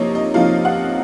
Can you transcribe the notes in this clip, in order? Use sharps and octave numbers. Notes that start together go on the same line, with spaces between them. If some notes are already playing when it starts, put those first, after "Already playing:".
Already playing: C3 F3 A#3 D#4 C#5 D#5
D#5
C3 F3 A#3 D#4 F5
F#5